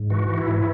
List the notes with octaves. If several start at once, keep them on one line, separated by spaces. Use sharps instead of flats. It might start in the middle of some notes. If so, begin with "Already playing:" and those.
Already playing: G#2
E3 F#4
E3
E4
G#2